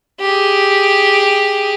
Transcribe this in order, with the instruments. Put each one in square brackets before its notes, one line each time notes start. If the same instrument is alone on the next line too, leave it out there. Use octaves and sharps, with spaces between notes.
[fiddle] G4 G#4